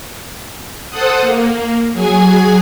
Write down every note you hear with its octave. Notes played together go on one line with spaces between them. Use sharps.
A4 C5 F#5 D#6
A#3
F#3 G#4 G#5